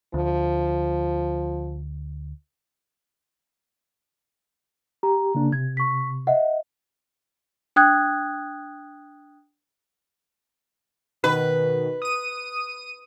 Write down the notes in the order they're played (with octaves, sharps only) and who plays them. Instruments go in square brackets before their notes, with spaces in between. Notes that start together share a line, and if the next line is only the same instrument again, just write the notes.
[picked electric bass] D2 [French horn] F3
[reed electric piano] G4 [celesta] A#5
[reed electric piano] C#3 A#3 D4
[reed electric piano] C3 [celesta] G#6
[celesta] C#6 B6
D#5 E5 F#5
D4 G5 D#6 F#6 G#6
[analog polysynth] B2 D#3 [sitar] B4
[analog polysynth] D#6 D#7